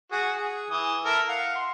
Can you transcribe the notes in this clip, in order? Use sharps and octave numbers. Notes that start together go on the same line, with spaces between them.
F#4 G#4
G#4
E3 D#6
E4 A4 A#4
F5 F#5
C6